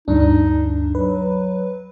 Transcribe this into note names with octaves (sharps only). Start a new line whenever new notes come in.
D2 G2 D4 D#4
F#3 B4